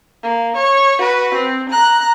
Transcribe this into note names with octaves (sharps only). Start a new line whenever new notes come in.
A#3
C#5
F#4 B4
C4
A#5 F#6